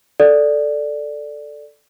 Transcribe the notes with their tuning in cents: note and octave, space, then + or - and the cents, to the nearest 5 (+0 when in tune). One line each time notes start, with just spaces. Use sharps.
A4 +0 D5 +0